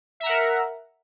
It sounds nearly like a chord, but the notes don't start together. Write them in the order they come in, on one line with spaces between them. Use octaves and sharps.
E5 A#5 F#5 A#4